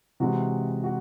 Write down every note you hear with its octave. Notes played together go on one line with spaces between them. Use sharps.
C3 E3 G#3 F#4
F#4